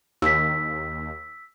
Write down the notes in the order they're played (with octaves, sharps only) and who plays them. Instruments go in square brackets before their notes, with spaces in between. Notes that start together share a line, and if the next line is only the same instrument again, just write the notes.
[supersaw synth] D#2 [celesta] E6 B6